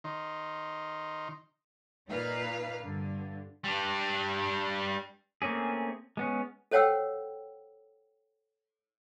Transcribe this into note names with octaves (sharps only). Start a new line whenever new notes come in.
D#3 D#4 C6
A#2 D#4 B4 F5
G2 D3
G3 D4
A3 A#3 C4 C#4 G#4
G#3 B3 C#4
A4 C5 C#5 F#5 G5 E6